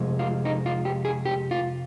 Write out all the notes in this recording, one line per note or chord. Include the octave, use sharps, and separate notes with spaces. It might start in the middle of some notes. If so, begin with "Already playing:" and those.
Already playing: F2 C3 F3 G#3
F4
D#4
F4
G4
G#4
G4
F4